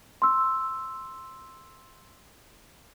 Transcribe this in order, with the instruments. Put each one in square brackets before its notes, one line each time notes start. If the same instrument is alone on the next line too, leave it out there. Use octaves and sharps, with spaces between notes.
[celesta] C6 E6